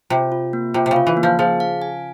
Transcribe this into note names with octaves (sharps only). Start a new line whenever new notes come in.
C3 F4
F4
A#3
C3 F4
C3
C#3
F4
E3
A#3
F3
F3 G#4
F5
G#5